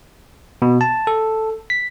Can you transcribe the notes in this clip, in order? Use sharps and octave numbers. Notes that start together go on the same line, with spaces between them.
B2
A5
A4
B6